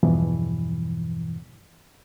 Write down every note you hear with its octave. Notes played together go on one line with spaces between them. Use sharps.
E2 G2 B2 E3 F3